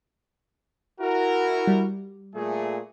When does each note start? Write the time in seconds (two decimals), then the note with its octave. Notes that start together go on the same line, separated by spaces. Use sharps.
1.01 E4 F#4 A#4
1.67 G3
2.34 A#2 A3 G#4